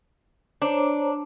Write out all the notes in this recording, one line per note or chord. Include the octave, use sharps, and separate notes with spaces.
D4 C5 C#5 A#5